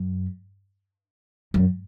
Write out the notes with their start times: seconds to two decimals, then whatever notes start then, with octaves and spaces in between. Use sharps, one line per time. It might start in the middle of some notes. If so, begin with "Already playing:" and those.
Already playing: F#2
1.54 F#2